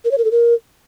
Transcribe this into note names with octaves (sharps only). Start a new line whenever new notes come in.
A#4
C#5
A#4
A4
A#4